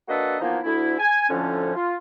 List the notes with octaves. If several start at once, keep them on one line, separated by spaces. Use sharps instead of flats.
A#3 D4 F#4 A4 B4 D#5
E3 F3 A#3 B3 D#4 E4
D2 E4
G#5
F2 A2 D3 F3 C#4
F4